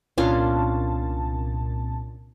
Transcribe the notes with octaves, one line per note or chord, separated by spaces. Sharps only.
C2 A#2 C#4 D4 F4 A5